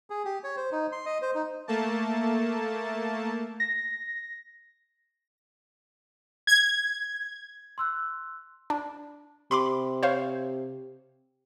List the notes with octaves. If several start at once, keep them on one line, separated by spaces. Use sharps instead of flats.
G#4
G4
C#5
C5
D#4
C6
D#5
C5
D#4
A3 A#3 A5
A#6
G#6
C6 E6 F#6
D4
C3 B5 C6 D6
C5 C#5 F5